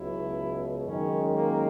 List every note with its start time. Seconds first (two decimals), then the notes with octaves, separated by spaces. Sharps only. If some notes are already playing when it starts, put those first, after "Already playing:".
Already playing: C#2 B2 F#3 E4
0.84 F#2 D#3 G#3 C#4
1.35 A#3